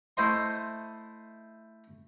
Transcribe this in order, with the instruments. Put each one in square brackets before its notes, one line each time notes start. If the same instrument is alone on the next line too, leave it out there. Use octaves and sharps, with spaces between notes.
[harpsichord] A3 E4 C5 D#5 C6